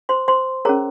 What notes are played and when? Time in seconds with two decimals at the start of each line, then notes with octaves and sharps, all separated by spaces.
0.09 C5 C6
0.28 C5 C6
0.65 C#4 G#4 A#4 C#5 A#5